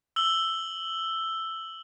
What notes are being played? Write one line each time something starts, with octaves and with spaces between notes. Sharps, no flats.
E6 F#7 G7